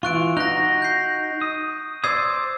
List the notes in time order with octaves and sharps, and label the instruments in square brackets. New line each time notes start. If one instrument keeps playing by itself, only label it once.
[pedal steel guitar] E3 F4 [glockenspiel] C#6 F#6 D7
[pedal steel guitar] D#4 F#4 [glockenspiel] F#6 A#6
[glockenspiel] G6 C7
[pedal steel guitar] D#6
[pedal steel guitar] C5 D5 D#6 [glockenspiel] E6 G#6 C7